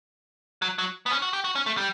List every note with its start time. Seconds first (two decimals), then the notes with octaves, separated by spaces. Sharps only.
0.62 F#3
0.78 F#3
1.06 B3
1.11 C#4
1.22 F#4
1.33 G4
1.44 F#4
1.55 C#4
1.66 A3
1.77 G3